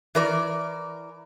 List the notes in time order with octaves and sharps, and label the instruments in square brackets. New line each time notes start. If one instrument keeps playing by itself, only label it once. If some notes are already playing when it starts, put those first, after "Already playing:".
[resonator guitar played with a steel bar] E3 A#4 D5